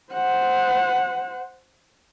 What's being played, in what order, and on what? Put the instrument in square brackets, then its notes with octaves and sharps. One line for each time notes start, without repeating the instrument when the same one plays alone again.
[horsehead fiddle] C5 F#5